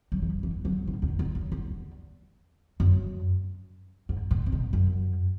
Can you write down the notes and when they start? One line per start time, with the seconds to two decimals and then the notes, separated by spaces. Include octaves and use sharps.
0.12 F#3
0.22 E3
0.43 E3
0.65 F#3
0.87 G#2
1.02 E2
1.19 E2
1.35 F#2
1.52 E2
2.80 F#2
4.09 G#2
4.31 A2
4.46 C#3
4.52 B2
4.73 F#2